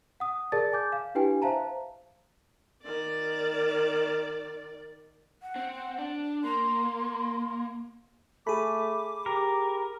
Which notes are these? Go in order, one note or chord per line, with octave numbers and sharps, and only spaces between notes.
F#5 D#6
G#4 A#4 D5 A5 A6
G#5 D6 G6
F5
D4 E4 G4 B4 G5 G#5
C5 E5 F5 A5 A#5
D#3 D5
F#5
C4
D4
A#3 C6
A3 G#4 B5 D6
G4 A#4